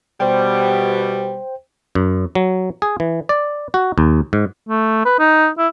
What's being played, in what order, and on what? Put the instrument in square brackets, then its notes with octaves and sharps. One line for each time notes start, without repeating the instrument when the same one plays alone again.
[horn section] B2 G3 [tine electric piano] C5 G5
[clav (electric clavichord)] F#2
F#3
G#4
E3
D5
F#4
D#2
G#2
[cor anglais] A3
B4
D#4
E4